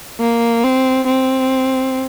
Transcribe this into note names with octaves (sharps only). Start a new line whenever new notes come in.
A#3
C4
C4